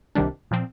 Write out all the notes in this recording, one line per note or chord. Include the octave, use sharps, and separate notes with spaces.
C2 C3 D#3 G3 D4
A#2 F3 C4